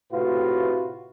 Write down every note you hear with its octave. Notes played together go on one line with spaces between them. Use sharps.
A2 C3 F4 F#4 B4